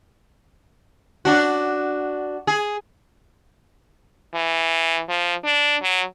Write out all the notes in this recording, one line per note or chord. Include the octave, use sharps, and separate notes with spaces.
D4 F#4
G#4
E3
F3
D4
F#3